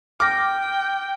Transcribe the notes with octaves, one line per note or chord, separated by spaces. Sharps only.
G5 D6 F6 A#6